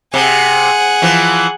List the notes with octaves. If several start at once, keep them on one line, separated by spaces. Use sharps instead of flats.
C3 G#4 F#5
E3 F3